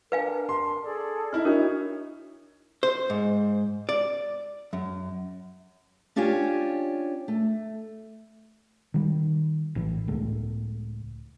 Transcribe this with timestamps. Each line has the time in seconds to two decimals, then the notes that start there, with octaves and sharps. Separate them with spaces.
0.12 D4 A#4 B4 F5 G#5
0.49 C6
0.83 G#4 A4 D5
1.33 D#4 E4 D#5 F6
1.45 D4 F#4 A#4 C#5
2.83 C5
3.10 G#2
3.89 D5
4.73 F#2
6.16 C#4 D4 F4 G4 C#5 G#5
7.28 A3
8.94 D#3 G3
9.75 A#1 A2 E3
10.08 C#2 A2 C#3 A3